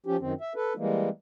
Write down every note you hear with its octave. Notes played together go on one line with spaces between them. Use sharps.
F3 C#4 G4
F#2 D#3 C4
E5
A4 B4
E3 G3 G#3 A#3